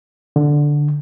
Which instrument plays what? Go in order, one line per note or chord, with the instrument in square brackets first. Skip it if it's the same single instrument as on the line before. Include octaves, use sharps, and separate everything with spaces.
[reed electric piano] D3